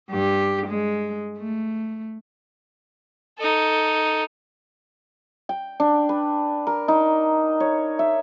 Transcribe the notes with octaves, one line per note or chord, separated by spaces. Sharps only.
G2 G4
G#3
A3
D#4 A4
G5
D4
B4
A#4
D#4
C#5
E5